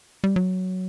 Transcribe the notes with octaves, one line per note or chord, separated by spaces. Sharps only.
G3
F#3